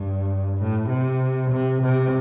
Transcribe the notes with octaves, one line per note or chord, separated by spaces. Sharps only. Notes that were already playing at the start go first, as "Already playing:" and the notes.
Already playing: G2
A2
C3
C3
C3